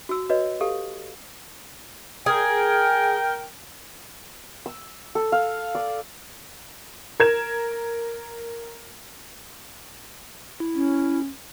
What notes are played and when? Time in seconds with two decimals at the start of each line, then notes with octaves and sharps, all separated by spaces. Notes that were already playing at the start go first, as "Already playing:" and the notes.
0.09 F#4 E6
0.29 F#4 B4 C#5 D#5
0.61 G4 A4 F5
2.26 G#4 A#4 G5
4.66 E6
5.15 A4
5.32 F5
5.75 D5
7.20 A#4 G#6 E7
10.60 E4
10.76 C#4